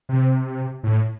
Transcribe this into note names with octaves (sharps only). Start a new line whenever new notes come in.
C3
A2